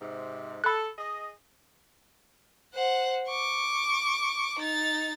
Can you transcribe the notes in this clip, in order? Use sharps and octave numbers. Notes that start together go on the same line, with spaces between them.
G#2 C3
A4 B5 F#6
G#4 D#5
C5 F#5
C#6 D6
D#4 A6